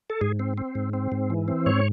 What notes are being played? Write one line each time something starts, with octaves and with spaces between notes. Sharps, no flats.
A4
G#2 G#4
C4
C4
G#2
C4
G#2
E3
C4
G#2 C#5